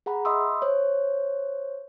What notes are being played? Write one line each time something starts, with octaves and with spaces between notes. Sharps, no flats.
G#4 F#5 A#5 B5
D#5 E5 B5 C6 D#6 E6
C5 C#5